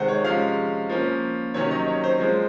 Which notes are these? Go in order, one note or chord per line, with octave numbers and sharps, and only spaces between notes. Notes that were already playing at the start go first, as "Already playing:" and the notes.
Already playing: C3 D#3 G#3 C5 F#5
C#5
C3 F3 G#3 C#4 F5
F3 A#3 C#4
C3 D#3 F#3 C#4 C#5
D#5
C#5
C5
F3 G#3 C4